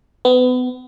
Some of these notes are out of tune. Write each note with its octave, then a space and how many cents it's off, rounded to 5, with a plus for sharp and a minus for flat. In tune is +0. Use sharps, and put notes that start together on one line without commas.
B3 +30